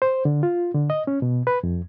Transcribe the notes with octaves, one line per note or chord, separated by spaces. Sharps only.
C5
D3
F4
D3
D#5
C#4
B2
B4
F2